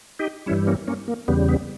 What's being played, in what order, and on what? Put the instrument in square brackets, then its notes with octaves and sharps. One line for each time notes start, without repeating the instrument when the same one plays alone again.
[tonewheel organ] D#4 G4
G2 E3 G3 C#4 E4
A#3 C#4
A#3 C#4
A#3
E2 C#3 G3 B3
B3